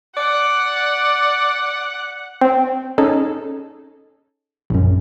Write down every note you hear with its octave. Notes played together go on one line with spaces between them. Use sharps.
D5 F#5
C4
C#4 D#4 G#4 A4
A#1 F#2